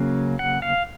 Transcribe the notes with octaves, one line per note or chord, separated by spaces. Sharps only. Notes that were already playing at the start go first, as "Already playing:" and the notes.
Already playing: C#3 F#3 A#3 C#4
F#5
F5